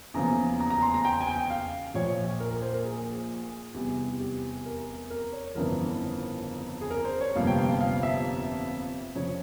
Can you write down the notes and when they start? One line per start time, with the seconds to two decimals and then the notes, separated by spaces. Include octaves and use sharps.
0.14 E2 C#3 F3 A#3 A#5
0.60 A#5
0.70 A#5
0.82 C6
0.94 A#5
1.05 G5
1.21 G#5
1.27 G5
1.50 F5
1.94 A#1 A#2 F3 C#5
2.40 A#4
2.51 A#4
2.62 C5
2.74 A#4
2.84 G#4
3.74 E2 C3 G3 G4
4.21 G4
4.66 A#4
5.10 A#4
5.32 C#5
5.55 G1 F2 C#3 E3 A#4
6.81 G#4
6.90 A#4
7.05 C5
7.21 C#5
7.35 G1 F2 C3 G3 A#3 F5
7.47 G5
7.58 F5
7.70 F5
7.81 F5
8.03 E5
9.15 F2 C#3 F3 C#5